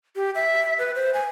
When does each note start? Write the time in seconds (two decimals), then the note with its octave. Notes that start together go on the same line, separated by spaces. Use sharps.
0.16 G4
0.35 E5
0.79 B4
0.95 C5
1.14 G#5